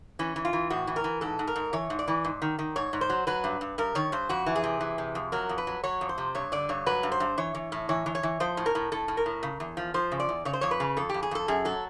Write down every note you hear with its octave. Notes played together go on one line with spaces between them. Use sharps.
E3 C#4
E3
F4
E3
A2 F#4
E3
A#4
E3
G#2 A4
G#2
A#4
G#2
E3 C#5
G#2
D5
E3
G#2
D#3
D#3
G#2 C#5
G#2
C5
F#3
F#3 B4
G2
G2
G2 A#4
D#3 C#5
G2 C5
F2 F#4
E3
G#4
C3
E3
C3
F2
F#3 A#4
F2
B4
F#3
F#3 C#5
F2
C5
C3
G2 C#5
D3 D5
G2 C#5
F#3 B4
G2
C5
G2
E3 C#5
E3
A2
E3 C#5
E3
C#5
E3
F3 C5
A2
A#4
A2
A2 A4
A2
A#4
A2
C#3
E2
F3
F3 C5
C#3
D5
E2
C#3 C#5
C5
F2 C#5
B4
C#3
F2 A4
F2 G4
G#4
F2 A4
F#2 G#4
F#3 A4